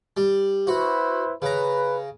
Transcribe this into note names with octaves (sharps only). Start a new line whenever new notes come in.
G3
E4 F#4 B4 C5
C#3 B4 A#5